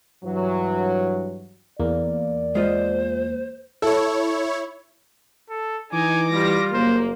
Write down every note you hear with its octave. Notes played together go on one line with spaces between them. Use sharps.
G2 E3 F#3
E2 A#3 D5
G#3 F4 C5 D#5
E4 A4 C#5
A4
E3 D#4 G#5 D6
G3 F4 A#6
F#1 A#3 C5